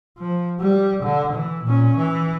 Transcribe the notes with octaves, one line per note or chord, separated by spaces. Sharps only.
F3
G3
D3
E3
A#2 C#4
E3